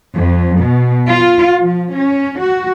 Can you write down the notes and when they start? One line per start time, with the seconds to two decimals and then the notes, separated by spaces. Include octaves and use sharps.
0.15 F2
0.61 B2
1.09 F4
1.60 F3
1.94 C#4
2.41 F#4